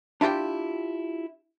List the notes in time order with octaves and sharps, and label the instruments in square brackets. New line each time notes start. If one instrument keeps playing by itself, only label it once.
[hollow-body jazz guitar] D4 E4 F4 G4 G5